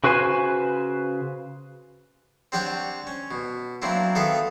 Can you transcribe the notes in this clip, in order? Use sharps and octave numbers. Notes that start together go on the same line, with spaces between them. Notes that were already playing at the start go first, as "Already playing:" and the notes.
C#3 F#4 B4 C5 G#5
C4 D4 G4 C#5 F#5 G5
C#4
B2
F#3 A#3 C4 D4 E4
D#3 B3 A4 E5 F5 D#6